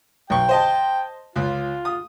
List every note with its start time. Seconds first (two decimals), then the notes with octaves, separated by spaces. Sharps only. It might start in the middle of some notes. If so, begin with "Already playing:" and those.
0.30 B1 G5 C#6
0.49 C5 D#5 A5
1.36 C#2 F4
1.85 D#6